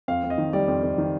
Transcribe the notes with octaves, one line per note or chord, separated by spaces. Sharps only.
F2 F5
F2
D#5
D#3
G3 D5
F2
F2
D#3